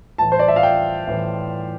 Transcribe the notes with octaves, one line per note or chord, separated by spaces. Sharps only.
A2 E3 A5
C5
D5
E5
F5
G5
A2 E3